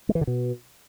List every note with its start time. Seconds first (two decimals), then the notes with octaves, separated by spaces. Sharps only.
0.09 G#3
0.15 E3
0.21 D3
0.27 B2